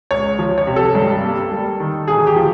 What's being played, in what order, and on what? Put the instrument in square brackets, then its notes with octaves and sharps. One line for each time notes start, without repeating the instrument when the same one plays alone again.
[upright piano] C#2 C#5
F3
C#5
C3
A4
G2
A#3
G3
D#3
E1 G#4
G4
F3